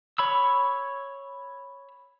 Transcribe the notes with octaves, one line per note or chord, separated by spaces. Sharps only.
C#5 B5 E6